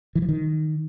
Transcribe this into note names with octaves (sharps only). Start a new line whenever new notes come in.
E3
F3
D#3